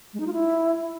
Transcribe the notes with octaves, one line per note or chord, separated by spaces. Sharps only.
G#3
D#4
F4
E4